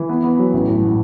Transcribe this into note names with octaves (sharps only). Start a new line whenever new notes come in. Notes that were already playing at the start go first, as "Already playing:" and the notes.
Already playing: E3
B3
B3
F#3
A1
A2
A2